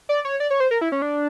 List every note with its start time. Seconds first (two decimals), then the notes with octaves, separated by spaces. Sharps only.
0.09 D5
0.25 C#5
0.40 D5
0.50 C#5
0.60 C5
0.71 A#4
0.81 E4
0.92 C#4
1.02 D4